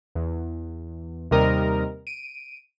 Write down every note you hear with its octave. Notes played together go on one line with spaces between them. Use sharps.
E2
D#2 C3 G3 A#4 D#5 A#5
D7 D#7